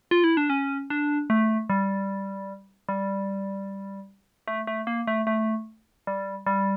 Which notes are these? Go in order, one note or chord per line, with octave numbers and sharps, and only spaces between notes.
F4
E4
D4
C#4
D4
A3
G3
G3
A3
A3
A#3
A3
A3
G3
G3